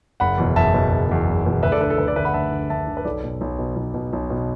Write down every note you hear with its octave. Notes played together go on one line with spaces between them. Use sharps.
F#1 F#5 B5
E2 B2
F#1 E5 A5
E2 B2
F#1
E2 B2
F#1
E2 B2
D2 B4 E5
A4 D5
D3 B4
A4
D2 B4
A4 D5
D3 B4 E5
F#5 B5
D2 E5 A5
D3
D2 E5 A5
D3
B4
B1 A4 D5
B2
B1
B2
B1
B2
B1
B2